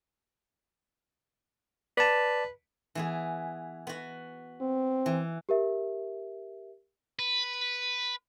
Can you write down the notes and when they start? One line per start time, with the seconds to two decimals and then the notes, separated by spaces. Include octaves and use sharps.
1.98 B4 D5 A5
2.95 E3 B3 G#4
3.87 B3 F#4
4.61 C4
5.06 E3
5.49 G4 A#4 E5
7.19 B4